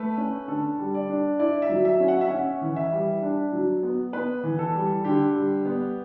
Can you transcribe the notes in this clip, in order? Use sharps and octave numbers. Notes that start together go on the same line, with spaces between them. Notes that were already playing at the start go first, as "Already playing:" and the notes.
Already playing: A3 B4
C#4
D3 A4
G3
D5
D4
E4 D5
E5
F#3
E5
C#4
F#5
E5
C#4 F#5
E3
E5
G3
D4
F#3
B3
B3 B4
E3
A4
G3
D3 G4
G3
B3